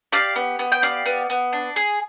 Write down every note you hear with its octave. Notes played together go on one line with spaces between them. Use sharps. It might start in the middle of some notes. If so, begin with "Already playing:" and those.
G4 D5 F5
B3
B3
G5
G4 D5 F5
B3
B3
D4
G#4